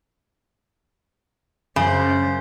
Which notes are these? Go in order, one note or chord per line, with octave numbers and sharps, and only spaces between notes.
F#2 C#3 C5